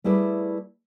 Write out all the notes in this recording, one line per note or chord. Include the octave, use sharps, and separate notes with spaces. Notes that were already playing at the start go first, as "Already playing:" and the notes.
G3 A3 E4 G#4 B4 D5